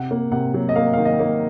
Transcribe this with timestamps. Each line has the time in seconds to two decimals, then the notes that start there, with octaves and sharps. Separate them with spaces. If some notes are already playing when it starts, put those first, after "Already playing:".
Already playing: C3 F#5
0.11 A#3
0.32 C3 F#5
0.54 F#3
0.69 D#5
0.76 A#3 F5
0.93 D#3 F5
1.05 D#5
1.20 A#3